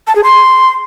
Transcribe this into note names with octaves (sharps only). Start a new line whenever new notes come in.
A5
G#4
C6